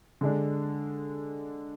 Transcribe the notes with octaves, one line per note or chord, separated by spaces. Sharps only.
D3 G#3 D4